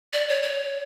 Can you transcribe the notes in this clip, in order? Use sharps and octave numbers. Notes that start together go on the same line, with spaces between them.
D5
C#5
C#5